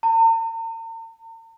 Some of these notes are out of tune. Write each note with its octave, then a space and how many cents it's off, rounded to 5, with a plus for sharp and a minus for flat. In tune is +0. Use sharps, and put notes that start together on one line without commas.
A#5 -45